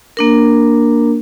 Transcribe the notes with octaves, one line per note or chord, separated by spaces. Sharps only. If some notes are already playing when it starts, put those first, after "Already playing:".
A#3 D4 A#4